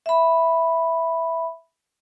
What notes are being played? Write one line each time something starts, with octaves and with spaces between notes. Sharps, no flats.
E5 B5